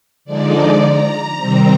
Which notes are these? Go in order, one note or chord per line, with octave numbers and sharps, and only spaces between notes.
D3 F3 G#3 D#4 D5
A#5
C3 D#3 G3 C4